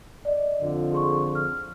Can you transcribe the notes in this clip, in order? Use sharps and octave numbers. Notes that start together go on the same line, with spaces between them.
D5 D#5
F2 D3 F3
G#4 C6 C#6
F6